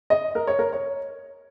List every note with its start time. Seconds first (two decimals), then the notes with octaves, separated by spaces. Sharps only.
0.10 D#5
0.35 A#4
0.47 C#5
0.59 A#4
0.73 C#5